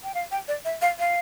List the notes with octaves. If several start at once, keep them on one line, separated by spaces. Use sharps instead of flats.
G5
F5
G5
D5
E5
F5
F5